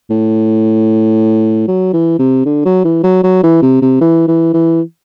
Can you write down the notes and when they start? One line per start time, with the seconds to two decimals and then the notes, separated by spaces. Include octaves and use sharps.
0.10 A2
1.68 F#3
1.93 E3
2.19 C3
2.45 D3
2.65 F#3
2.85 E3
3.04 F#3
3.24 F#3
3.43 E3
3.62 C3
3.82 C3
4.01 E3
4.28 E3
4.54 E3